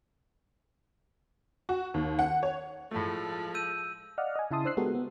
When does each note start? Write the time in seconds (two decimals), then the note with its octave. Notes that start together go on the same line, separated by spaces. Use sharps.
1.69 F#4
1.94 D#2
2.19 F#5
2.43 C#5
2.91 A2 F3 G#3 A3 A4
3.55 E6 G6 D#7
4.18 D5 D#5 F5 F#5 F6
4.36 D#5 G#5
4.51 C#3 E4 E5 A5 C6 D#6
4.65 D4 C5 E6 F#6 C7
4.77 G#3 B3 F#4 G4 A4 A#4
4.95 B3